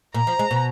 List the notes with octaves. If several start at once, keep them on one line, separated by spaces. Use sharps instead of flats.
A#2 A#5
F3
G#3
B2